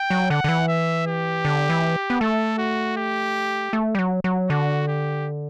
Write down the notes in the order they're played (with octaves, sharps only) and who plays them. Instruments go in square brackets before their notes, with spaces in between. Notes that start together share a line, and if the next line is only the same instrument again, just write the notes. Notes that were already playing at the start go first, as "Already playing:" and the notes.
Already playing: [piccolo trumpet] G5
[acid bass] F#3
[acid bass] D3 [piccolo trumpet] F#5
[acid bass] D3
E3
[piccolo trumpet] E5
G4
[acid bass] D3
E3
B3
[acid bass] A3 [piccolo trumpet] A4
[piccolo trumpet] F#4
G4
[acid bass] A3
G3
F#3
F#3
[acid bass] D3 [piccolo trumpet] F#4
[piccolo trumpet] G4